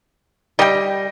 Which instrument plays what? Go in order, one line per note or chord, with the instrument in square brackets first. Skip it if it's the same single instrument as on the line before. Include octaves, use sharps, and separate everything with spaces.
[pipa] G3 [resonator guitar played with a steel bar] D#5 G5